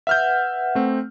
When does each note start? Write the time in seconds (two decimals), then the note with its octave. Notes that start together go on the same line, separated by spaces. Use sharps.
0.07 B4 E5 F#5 F6 G6
0.75 A3 C4